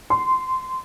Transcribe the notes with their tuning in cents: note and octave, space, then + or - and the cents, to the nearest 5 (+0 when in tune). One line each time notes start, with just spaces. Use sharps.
C6 -15